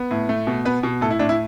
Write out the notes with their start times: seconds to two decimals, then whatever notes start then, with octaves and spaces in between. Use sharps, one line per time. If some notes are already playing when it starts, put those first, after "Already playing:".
Already playing: B3
0.11 A2
0.29 A3
0.47 B2
0.65 B3 B4
0.83 B2
1.01 A2 A4
1.10 E4
1.19 A2 D4
1.29 E4